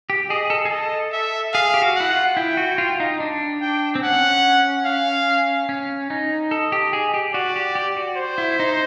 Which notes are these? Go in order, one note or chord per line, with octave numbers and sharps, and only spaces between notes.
G4
G#4 D#5
A4
G#4
A4 D#5
E5
G#4 F5
G4
F#4
E4 F#5
F4
E4 G5
F#4
F4
D#4
D4
G5
C4
C#4 F#5
F5
C#4
D#4
A4 D#5
G4
G#4
G4
F#4 D5
G4
G4
F#4
C5
E4
D#4